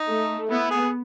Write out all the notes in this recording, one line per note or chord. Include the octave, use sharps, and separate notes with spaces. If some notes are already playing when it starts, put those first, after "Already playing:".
Already playing: D#4
A3
B3 E4
G#4